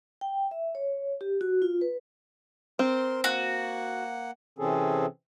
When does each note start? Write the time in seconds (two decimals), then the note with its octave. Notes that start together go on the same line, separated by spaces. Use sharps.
0.21 G5
0.51 E5
0.75 C#5
1.21 G4
1.41 F#4
1.62 F4
1.81 B4
2.79 C4 A#4 C6
3.24 A#3 F#4 F#5
4.59 C3 E3 C4 C#4 G#4 A4